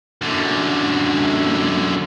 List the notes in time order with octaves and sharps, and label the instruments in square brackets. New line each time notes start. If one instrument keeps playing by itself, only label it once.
[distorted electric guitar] F#2 D3